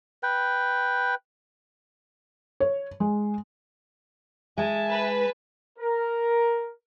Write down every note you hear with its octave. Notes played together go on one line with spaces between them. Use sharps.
B4 G5
C#5
G#3
G#3 E5 G#5 A5
B4
A#4